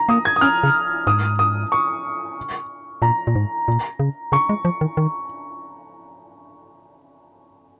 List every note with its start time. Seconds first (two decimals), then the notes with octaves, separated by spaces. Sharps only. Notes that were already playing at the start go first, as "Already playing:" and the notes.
Already playing: A#5
0.09 A#3 D#6
0.25 G#6
0.36 D#6
0.41 C#4 F6
0.63 C#3
1.07 G#2 D#6
1.39 D#6
1.72 C#6
3.02 A#2 A#5
3.27 A#2
3.36 G#2
3.68 A#2
3.99 C#3
4.32 C#3 C#6
4.49 G#3
4.65 F3
4.81 D#3
4.97 D#3